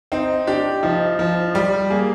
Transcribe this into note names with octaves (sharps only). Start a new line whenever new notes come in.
C4 D#4
D4 G4
F3 D#4
F3
G3 G4
A#3 G#4